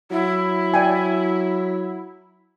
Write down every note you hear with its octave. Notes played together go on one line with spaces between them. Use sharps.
F#3 E4
D5 G5 G#5